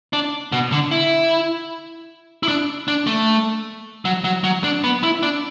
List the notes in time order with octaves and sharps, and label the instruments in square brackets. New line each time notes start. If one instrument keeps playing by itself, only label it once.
[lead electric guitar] D4
B2
D3
E4
E4
D4
D4
A3
F#3
F#3
F#3
D4
B3
E4
D4